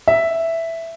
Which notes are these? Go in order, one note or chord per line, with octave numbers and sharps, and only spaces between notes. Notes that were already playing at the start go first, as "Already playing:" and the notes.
E5